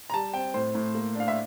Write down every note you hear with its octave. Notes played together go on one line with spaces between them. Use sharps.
A#5
G3 A5
C4 G5
A2 C5
A2
A#3
D4 F5
E5